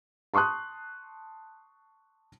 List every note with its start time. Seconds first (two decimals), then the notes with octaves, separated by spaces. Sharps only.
0.34 A5 C6 C#6 D#6 F#6